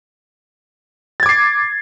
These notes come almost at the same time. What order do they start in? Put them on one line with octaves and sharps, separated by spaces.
A6 G#6 D6 C7